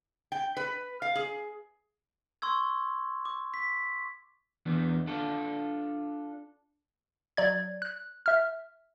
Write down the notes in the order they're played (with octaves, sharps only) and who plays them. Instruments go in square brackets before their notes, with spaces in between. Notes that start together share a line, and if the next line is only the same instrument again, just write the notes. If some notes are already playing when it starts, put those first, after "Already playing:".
[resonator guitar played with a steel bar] G5
B4
F5
G#4
[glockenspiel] C6 C#6 E6 G#6
D6
B6
[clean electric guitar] E2 E3 B3 D4
D4 F4 A4
[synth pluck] F#3 D5 G#6
F#6
E5 F6